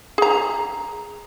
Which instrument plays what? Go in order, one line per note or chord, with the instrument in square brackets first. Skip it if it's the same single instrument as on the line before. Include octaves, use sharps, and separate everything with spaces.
[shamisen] G#4 A#5